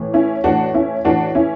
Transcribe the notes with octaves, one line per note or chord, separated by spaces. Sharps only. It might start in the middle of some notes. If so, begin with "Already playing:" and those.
Already playing: A2 E3
C#4 E4
A2 E3 D4 F#4
C#4 E4
A2 E3 D4 F#4
C#4 E4